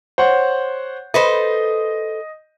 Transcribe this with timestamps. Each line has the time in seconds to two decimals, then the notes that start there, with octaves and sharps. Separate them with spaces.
0.18 C5 C#5 F#5
1.14 A4 B4 C5 D#5